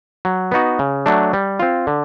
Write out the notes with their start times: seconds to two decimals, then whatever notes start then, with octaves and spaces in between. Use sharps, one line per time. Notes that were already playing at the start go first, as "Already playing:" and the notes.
0.25 F#3
0.51 B3 D#4 F#4
0.79 C#3
1.06 F#3 A3 D4
1.33 G3
1.59 C4 F4
1.87 D3